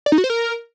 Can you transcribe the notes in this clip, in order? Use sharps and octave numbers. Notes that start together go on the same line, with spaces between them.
D5
D#4
F#4
C5
A#4